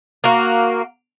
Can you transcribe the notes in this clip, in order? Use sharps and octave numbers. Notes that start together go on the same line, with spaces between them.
A#3 F#4